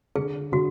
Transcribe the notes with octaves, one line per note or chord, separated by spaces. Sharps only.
D3 G#4
D3 F#4